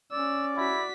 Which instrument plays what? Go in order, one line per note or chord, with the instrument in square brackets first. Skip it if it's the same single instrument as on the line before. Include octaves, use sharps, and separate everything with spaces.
[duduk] C#4 [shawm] D5 [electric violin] E6
[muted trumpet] E4 [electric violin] F#4 B6